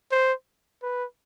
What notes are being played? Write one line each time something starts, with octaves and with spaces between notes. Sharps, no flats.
C5
B4